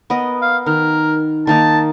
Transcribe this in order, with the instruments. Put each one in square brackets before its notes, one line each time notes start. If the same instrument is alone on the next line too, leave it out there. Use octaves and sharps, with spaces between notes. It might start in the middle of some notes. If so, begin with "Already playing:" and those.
[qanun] B3 A#4 D#5
[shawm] F5
[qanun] D#3 [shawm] A#4
[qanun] D#3 A#3 D#4 [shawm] A5